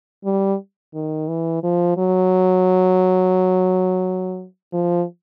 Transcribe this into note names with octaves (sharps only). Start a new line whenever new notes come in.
G3
D#3
E3
F3
F#3
F3